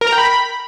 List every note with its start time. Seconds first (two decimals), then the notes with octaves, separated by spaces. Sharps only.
0.01 A#4
0.07 A#5
0.12 G5
0.18 B5